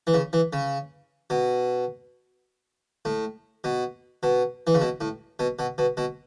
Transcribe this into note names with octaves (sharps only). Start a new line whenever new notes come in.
E3
C#3
E3
C#3
B2
A2
B2
B2
E3
C#3
B2
A2
B2
B2
B2
B2